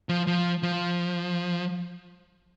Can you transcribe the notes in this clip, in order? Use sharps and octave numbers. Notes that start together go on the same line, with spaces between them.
F3
F3
F3